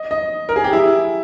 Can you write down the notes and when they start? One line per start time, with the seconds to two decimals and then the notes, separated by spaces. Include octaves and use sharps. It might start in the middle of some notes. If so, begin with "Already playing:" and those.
Already playing: D#5
0.11 D#5
0.49 A#4
0.56 G#4
0.64 G4
0.73 E4